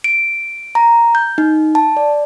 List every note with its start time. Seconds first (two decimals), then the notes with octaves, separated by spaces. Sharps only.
0.04 D7
0.75 A#5
1.15 G6
1.38 D#4
1.75 A5
1.97 D5